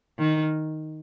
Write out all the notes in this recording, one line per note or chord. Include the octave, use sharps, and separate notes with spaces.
D#3